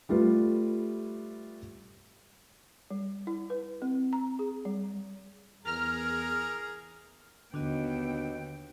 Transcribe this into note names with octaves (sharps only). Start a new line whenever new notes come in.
G3 A3 F4 B4
G3
E4
B4
C4
A#5
G#4
G3
E2 G#4 A#4 A#5 F6
D#2 D3 B3 D4 F#4 D#5 G5